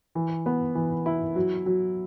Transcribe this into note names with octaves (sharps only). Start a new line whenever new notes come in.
E3
B3
E3
E4
F#3
F#3